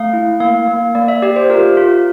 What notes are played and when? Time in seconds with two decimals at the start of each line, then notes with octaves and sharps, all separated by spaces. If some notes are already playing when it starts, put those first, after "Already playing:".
Already playing: A3 F5
0.13 E4
0.40 A#3 F5
0.68 A#3
0.95 A#3 D5
1.08 E5
1.22 G4 D5
1.36 C5
1.50 F4 A#4
1.77 F4